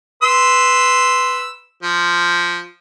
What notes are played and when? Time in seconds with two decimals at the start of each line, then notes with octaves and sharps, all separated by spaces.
0.23 B4 C6 E6
1.83 F3